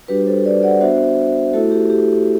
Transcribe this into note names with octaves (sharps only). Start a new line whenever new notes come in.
G3 D4 F#4 G4 B4
B4
A4 C5
B4 D5
D5 F#5
B3 D4 F#4 C5 E5
A3 E4 F#4 A4
G4
G4